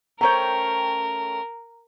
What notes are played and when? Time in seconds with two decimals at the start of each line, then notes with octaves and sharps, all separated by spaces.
0.21 A3 C#4 A#4 C5 G5 A#5